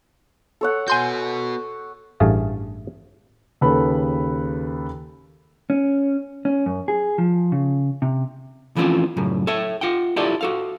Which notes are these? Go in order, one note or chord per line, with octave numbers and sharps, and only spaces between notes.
A4 C#5 F#5
B3 F#4 G#5 C6 G6
A1 G2 A3 G#4 F5 A5
D#2 C#3 A4 B4 B5
C#4
C#4
F#2
G#4
F3
C#3
C3
E3 F3 A3 C4 C#4 F4
F#2 A2 C#3
A4 C#5 E5
F4 F#5 G5
E4 F4 G4 A4 C#5 D5
F#4 A4 F5